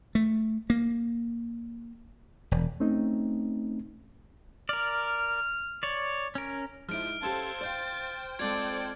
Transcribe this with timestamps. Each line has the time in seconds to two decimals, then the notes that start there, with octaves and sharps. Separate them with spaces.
0.15 A3
0.70 A#3
2.51 E1
2.80 A3 C4 C#4 D#4
4.69 A#4 D5 F6
5.83 C#5 D5
6.35 C#4 A#4
6.89 F3 G#3 D#4 E4 F6 D7
7.22 C#4 G4 A4 C5 F5 A5 G#6
7.61 C5 D5 F5 G5 A6
8.39 G#3 C4 F4 A4 D5 G#6